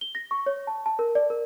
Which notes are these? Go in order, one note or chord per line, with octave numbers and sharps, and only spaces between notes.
G7
A#6
C#6
C#5
A5
A5
A#4
D5
A#4